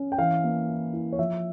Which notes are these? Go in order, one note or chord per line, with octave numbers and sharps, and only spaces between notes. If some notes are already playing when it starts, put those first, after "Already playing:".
Already playing: C#4
G5
E3 F5
A#3
E4
E4
C#5
F3 E5